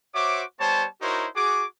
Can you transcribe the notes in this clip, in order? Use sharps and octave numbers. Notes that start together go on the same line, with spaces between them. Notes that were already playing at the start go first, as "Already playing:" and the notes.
F#4 C5 C#5 E5 D6
G3 B3 C5 C#5 A5
D#4 E4 F#4 A#4 C5 C#5
F#4 G#4 D6